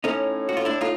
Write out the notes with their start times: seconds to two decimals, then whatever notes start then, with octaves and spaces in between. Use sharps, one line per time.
0.04 A2 C#4 D#4
0.49 F#4
0.57 F4
0.65 D4 E4
0.81 D#4 F4